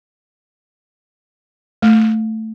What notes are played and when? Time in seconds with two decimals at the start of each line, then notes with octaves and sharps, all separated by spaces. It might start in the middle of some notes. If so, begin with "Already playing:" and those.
1.82 A3